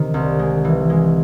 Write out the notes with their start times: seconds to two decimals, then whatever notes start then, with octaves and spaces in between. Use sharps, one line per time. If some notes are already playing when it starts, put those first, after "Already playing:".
Already playing: C3 D#3
0.14 C2
0.39 G#3
0.65 E3
0.90 G#3